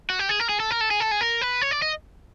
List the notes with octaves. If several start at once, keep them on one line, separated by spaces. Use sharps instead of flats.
F#4
G4
G#4
A#4
G#4
A4
A#4
A4
G#4
A4
G#4
A#4
B4
C#5
D5
D#5